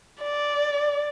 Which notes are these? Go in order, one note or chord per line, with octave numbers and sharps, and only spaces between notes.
D5